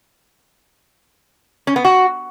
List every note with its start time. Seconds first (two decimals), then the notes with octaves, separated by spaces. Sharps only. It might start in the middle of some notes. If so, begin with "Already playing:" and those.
1.67 C#4
1.76 B3
1.85 F#4